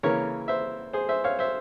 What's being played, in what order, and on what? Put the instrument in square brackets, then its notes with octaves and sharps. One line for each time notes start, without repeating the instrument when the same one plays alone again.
[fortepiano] C#3 E3 A#3 A#4 C#5
C5 E5
G#4 C5
C5 E5
C#5 F5
C5 E5